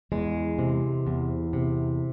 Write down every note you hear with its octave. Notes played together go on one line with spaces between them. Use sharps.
E2 G#3
C3
E2
C3